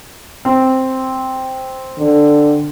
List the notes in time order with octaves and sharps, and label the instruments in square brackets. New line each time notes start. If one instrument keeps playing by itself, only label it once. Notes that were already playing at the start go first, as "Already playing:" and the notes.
[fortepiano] C4
[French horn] D3